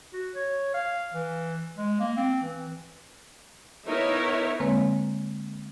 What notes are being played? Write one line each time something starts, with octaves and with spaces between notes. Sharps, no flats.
F#4
C#5
F5
E3
G#3
A#3
C4
E3
B3 D#4 E4 A#4 C#5 E5
D3 G#3 A#3 C4 B4 C#5